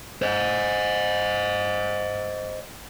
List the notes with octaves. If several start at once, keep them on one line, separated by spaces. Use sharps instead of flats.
C5 D#5